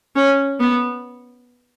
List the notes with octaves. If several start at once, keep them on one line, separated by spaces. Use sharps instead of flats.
C#4
B3